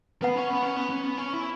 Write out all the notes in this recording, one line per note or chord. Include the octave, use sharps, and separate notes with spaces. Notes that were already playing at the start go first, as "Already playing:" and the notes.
B3 B4 F#5 B5
C#4
B3
C#4
B3
C#4
B3
C#4
E4